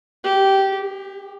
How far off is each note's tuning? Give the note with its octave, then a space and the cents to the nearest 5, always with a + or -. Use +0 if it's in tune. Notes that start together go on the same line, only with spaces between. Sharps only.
G4 -15
G4 +35